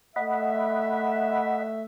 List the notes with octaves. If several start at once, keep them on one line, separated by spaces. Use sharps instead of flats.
A3 D#5 E5 F#5 B5